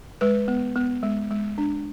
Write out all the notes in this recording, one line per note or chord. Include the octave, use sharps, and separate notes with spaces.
G#3 B4
B3
B3
G#3
G#3
D4